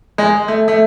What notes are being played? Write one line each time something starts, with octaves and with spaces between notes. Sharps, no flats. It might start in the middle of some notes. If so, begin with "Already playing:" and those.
G#3
A3
A3